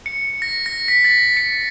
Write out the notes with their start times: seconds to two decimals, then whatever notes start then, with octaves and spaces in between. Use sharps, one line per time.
0.06 C#7
0.42 A#6
0.66 A#6
0.88 B6
1.04 A6
1.37 C#7